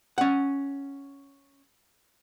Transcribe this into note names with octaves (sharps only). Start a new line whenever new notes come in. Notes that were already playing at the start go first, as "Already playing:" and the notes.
C#4 F#5